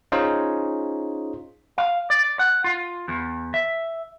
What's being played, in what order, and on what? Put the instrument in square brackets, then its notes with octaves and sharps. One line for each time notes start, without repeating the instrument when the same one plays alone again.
[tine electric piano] C#4 D#4 F4 G#4 C5
[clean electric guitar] F5
D5
F#5
F4
E2
E5